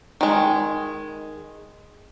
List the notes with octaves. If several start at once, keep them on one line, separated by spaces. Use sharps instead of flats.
D#3 G#3